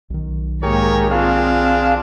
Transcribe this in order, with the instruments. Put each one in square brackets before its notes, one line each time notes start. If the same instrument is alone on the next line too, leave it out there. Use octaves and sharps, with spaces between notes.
[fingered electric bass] B1 D#3
[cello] G#2 A#3 [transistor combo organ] G4 G#4 A#4 [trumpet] C#5
[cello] C4 F4 [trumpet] D4 [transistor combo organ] G#4 F5